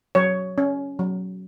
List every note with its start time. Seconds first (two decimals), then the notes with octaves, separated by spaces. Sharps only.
0.15 F#3 C#5
0.58 C#4
0.99 F#3